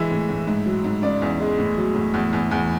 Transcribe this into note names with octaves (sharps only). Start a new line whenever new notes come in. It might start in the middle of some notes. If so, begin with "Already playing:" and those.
Already playing: E3 G#3 E5
A2
A2
G#2
F#3
G#2
C#3 D5
E2
G#3
A2
F#3
A2
E2
E2
E2